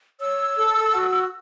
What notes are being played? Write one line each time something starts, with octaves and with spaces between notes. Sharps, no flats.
C#5 E6
A4
F#4